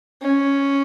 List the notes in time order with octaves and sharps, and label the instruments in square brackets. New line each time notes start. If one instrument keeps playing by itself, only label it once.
[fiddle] C#4